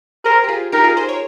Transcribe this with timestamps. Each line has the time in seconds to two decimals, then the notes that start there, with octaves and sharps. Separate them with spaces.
0.25 G#4 A#4 C5
0.44 G4
0.49 F4 G#4
0.72 D#4 G4 A#4
0.84 F4 G#4
0.97 G#4 C5
1.08 A#4 C#5